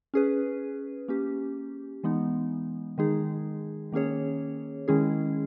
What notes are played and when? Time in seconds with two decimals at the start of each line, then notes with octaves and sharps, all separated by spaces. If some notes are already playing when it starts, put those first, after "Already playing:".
0.14 C#4 G#4 B4
1.08 A#3 C#4 G4
2.04 E3 G#3 B3 D#4
2.98 D#3 G#3 D#4 G#4
3.92 D#3 A#3 C#4 G#4 C#5
4.88 D#3 G#3 C#4 E4 G#4